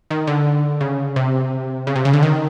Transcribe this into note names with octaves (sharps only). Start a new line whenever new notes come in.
D#3
D3
C#3
C3
C#3
C3
C#3
D3
D#3